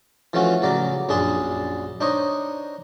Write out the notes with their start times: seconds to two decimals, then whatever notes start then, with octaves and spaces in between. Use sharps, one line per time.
0.33 E3 F3 A3 C#4 F4 F#4
0.62 A1 C#3 F#3 D5 A#5
1.09 A#1 F#2 D4 G#4 A5 C6
2.01 D4 D#4 C5 C#5 D#5